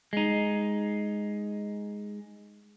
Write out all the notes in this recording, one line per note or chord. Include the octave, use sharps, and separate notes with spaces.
G#3 D#4